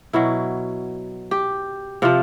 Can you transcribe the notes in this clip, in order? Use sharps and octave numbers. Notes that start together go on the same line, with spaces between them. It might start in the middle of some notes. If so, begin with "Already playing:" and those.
B2 F#3 E4
G4
C3 F3 F4